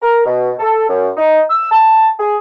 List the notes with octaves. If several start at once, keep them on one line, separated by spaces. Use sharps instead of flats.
A#4
B2
A4
F#2
D#4
E6
A5
G#4